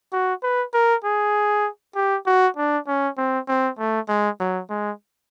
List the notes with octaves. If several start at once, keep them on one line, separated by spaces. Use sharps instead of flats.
F#4
B4
A#4
G#4
G4
F#4
D4
C#4
C4
C4
A3
G#3
F#3
G#3